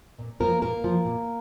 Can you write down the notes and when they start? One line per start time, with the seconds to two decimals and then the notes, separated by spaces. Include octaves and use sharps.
0.19 A#2
0.40 F3 A#3 A#4
0.61 A#2 A#3 A#4
0.84 F3
1.05 A#2